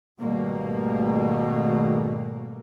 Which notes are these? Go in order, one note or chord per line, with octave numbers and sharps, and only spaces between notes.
G#1 B2 G3 A3 A#3